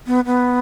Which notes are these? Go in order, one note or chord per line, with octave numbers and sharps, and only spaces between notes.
B3
B3